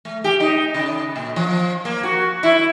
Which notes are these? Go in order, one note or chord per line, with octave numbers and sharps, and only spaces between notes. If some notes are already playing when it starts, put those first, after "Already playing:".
A3
G4
D#4
C#3
A#2
F3
A#3
F#4
E4